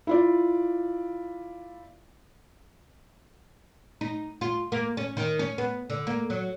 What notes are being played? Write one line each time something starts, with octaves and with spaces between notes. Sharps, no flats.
E4 F4 D5
D#4
F4
A#3
C#4
D#3
C#4
B3
D3
A#3
F#3